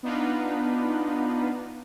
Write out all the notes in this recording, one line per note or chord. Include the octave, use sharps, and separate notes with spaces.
B3 D4 D#4 F4 B4